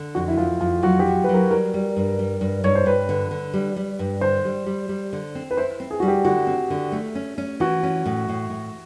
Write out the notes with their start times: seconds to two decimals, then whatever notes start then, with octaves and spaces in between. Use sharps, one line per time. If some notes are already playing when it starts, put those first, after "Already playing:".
Already playing: D3
0.15 F2 F#4
0.28 E4
0.37 F2 F4
0.61 F2 F4
0.83 F#3 F#4
0.99 G4
1.06 F#3
1.24 F#3 B4
1.34 A#4
1.51 G3 A#4
1.74 G3
1.96 G2
2.19 G3
2.41 G2
2.64 G2 C#5
2.75 C5
2.86 G2 B4
3.09 D3
3.31 D3
3.54 G3
3.76 G3
3.99 G2
4.21 D3 C5
4.45 G3
4.66 G3
4.89 G3
5.13 D3
5.35 C4
5.51 B4
5.57 E4 C5
5.80 C4
5.91 G#4
6.00 G3 F#4
6.08 G4
6.25 D3 F#4
6.47 C4
6.70 D3
6.92 A3
7.15 C#4
7.38 C#4
7.60 E3 F#4
7.84 C#4
8.06 A2
8.29 A2
8.50 A2